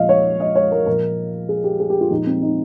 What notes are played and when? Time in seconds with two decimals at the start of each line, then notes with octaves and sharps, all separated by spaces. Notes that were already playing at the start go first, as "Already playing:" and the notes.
Already playing: A#2 F3 D#5 F5
0.09 C#5
0.40 D#5
0.55 C#5
0.72 A#4
0.86 A#2 F3 A#4
1.49 G#4
1.64 G4
1.80 G#4
1.90 G4
2.01 F4
2.10 A#2 F3 D#4
2.26 C4
2.42 D#4